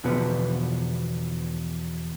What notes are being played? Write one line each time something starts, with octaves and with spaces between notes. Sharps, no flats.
E2 B2 D3 F3 B3